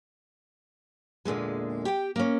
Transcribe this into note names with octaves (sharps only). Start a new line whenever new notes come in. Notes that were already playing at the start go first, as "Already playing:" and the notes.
E2 A#2 D3 G#3
G4 G5
A#3 C#4